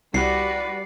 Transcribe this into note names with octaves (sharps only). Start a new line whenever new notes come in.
C2 G3 F#4 B4 D5 C7 C#7